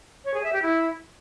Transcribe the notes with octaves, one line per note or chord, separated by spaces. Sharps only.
C#5
G#4
E5
G4
E4